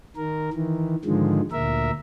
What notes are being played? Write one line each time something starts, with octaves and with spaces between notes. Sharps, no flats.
D#3 A#4
D#3 E3
G#2 D3 D#3 F3 G#3
D2 A#2 A#4 E5